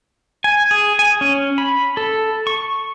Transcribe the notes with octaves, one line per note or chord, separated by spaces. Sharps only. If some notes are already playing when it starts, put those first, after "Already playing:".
G#5
G#4
G#5
C#4
B5
A4
C#6